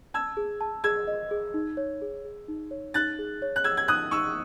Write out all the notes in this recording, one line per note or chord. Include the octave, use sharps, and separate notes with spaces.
A5 E6 G#6
G#4
A5
G#4 E6 G#6
D#5
G#4
D#4
C#5
G#4
G#4
D#4
C#5
D#4 F#6 A6
G#4
C#5
F#6
G#4 E6 G#6
G#6
D#4 D#6 F#6
D#4 C#6 E6